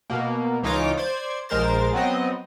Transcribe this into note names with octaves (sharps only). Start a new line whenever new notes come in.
B2 A#3
C#2 E3 D#4 F4 C#5 D6
C5 D5 G#6
A#1 G#3 A#4 C5 A6
F#3 B3 C4 D#5